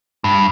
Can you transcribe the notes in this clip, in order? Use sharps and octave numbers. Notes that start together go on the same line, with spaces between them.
G2